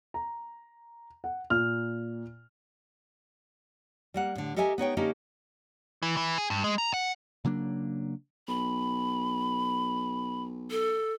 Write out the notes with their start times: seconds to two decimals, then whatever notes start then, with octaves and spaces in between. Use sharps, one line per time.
0.14 A#5
1.24 F#5
1.50 A#2 F6
4.14 G3 A#3 F#5
4.35 A2 D3
4.56 G4 A4 A#4 D#5 E5 G#5
4.78 B3 D#4 C#5 G5
4.97 D3 A#3 C#4 D#4 G4 A4
6.03 E3
6.17 E3
6.38 G#4
6.50 G2
6.64 G#3
6.78 A#5
6.94 F#5
7.45 C#3 F#3 A#3 D4
8.48 B1 B5
10.71 A4